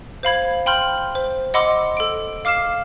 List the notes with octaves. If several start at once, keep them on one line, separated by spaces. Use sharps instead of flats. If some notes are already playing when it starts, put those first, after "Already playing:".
C5 F5 B5 G#6
G5 B5 C6 F6 G6 F#7
C5
D#5 F#5 B5 C6 D6 E6
A4 D7
F5 D6 F6 C7 E7